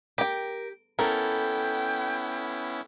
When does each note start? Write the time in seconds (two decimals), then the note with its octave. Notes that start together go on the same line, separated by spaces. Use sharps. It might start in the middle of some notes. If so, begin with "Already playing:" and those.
0.18 G4 A#4 G5
0.99 B3 C#4 E4 A4 A#4 G5